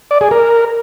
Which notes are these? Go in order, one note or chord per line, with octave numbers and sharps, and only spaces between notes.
D5
G#4
A#4